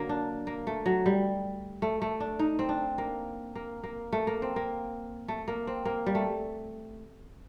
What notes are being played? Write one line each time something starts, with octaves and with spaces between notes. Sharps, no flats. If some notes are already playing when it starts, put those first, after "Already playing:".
Already playing: D3 F#3 A#3
D4
A#3
A3
F#3
G3
A3
A3
D4
D#4
C4
D4
A#3
A#3
A#3
A3
A#3
C4
A#3
A3
A#3
C4
A#3
G3
A3